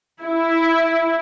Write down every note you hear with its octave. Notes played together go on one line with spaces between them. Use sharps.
E4